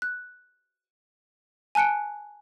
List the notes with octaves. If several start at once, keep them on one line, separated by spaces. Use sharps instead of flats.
F#6
G#5 A5 F#6 C#7 D7